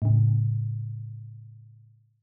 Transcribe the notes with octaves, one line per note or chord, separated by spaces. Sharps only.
A2 C#3